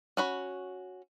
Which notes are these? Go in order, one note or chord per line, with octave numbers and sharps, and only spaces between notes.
C#4 F#4 B5